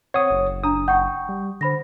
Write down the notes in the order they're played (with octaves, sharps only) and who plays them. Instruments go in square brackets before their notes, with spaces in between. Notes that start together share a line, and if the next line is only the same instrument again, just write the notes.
[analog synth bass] C4 [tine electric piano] C#5 D#6 [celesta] F#5
[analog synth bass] F#1
[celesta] D4 A#5 [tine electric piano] D#6
[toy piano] F#5 [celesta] G5 C#6 G6
[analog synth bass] G3
[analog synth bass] D3 [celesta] C5 B5 A#6